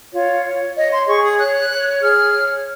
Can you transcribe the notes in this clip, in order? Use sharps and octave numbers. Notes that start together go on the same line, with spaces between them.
F4 C#5
C#5
C#5 D#5
C6
G#4 C#6
D#6
C#5 F#6
C#5
G#4 F6
C#5